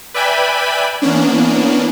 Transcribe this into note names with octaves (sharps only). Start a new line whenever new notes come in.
B4 D5 E5 G5 G#5 B5
E3 A#3 B3 C#4 D4